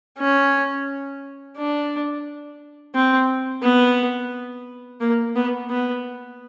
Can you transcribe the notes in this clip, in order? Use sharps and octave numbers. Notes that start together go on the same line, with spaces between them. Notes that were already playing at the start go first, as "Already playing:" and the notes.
C#4
D4
C4
B3
A#3
B3
B3